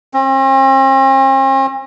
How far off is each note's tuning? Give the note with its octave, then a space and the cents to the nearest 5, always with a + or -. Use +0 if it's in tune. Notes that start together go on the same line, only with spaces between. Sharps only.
C4 +45